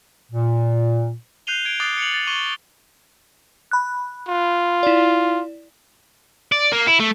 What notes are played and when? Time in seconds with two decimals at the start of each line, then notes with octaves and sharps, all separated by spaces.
0.32 A#2
1.47 F#6 G6 C7 D#7 F7 G7
1.65 G#6 D7
1.80 D6 D#6 F#6 A6 C7
1.98 C#7 F7 F#7
2.14 A6
2.27 C#6 D6 D#7 G7
3.71 B5 F#6
4.28 F4
4.83 E4 D5
6.52 D5
6.72 A#3
6.87 E4
7.00 A3